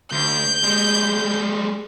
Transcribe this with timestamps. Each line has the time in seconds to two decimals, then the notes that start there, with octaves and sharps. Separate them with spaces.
0.12 D2 G6
0.63 G3 G#3